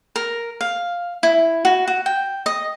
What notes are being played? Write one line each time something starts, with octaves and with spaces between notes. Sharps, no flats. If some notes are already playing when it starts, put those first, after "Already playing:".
A#4
F5
E4
F#4
F#4
G5
D#5